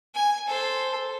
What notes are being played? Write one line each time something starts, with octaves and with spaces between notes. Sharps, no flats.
G#5
A4 C5